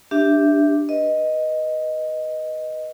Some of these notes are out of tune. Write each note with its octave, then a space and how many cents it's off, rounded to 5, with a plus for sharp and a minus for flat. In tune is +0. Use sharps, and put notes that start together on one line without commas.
D4 +0 G4 +0 E5 +0
B4 -15 D#5 +0